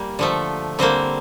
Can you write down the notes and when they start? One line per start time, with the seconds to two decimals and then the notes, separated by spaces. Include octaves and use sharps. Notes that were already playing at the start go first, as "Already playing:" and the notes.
Already playing: G3 A#3
0.19 D3 F3 A3
0.79 D3 G3 A#3 C4 C5